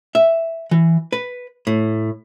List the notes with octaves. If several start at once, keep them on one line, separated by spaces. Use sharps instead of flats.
E5
E3
B4
A2